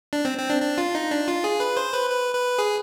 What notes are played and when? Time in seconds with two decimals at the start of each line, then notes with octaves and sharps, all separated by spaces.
0.13 D4
0.25 C4
0.38 C4
0.50 D4
0.62 D4
0.78 F4
0.95 D#4
1.11 D4
1.28 F4
1.44 G#4
1.60 B4
1.77 C5
1.93 B4
2.10 B4
2.34 B4
2.58 G#4